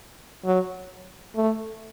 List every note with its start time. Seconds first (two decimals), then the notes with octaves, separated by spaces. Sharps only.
0.45 F#3
1.36 A3